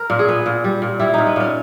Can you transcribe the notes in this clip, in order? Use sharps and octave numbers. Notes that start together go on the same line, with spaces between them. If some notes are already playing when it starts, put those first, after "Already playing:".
Already playing: A#4
A#2
G#4
B3
A#2
G3
A#2
G3 E4
A#2 D#4
B3
A#2 C#4